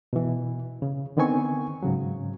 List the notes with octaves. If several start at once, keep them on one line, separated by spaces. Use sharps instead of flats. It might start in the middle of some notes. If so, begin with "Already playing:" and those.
B2 E3
C#3
D3 D#3 B3 C4 G#5 C#6
G#2 C#3 F#3